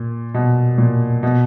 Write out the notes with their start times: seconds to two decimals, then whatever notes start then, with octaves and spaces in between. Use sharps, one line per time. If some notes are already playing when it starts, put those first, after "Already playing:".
Already playing: A#2
0.34 B2
0.78 A#2
1.23 B2